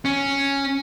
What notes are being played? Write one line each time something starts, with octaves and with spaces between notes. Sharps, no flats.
C#4